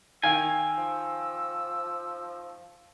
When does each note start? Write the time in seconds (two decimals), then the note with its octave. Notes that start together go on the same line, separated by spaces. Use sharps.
0.24 D#3 F5 G5 G#5 E6
0.77 F3